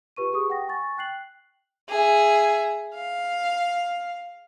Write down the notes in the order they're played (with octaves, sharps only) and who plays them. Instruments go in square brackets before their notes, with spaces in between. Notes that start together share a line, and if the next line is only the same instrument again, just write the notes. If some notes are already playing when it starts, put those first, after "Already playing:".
[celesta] F4 G4 B4 C#6 D#7
G4 G#4 C#6 D#6
F#5 G5 A#6
G#5 C#6 A6
G5 F#6 C7 F#7
[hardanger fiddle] G#4 E5
F5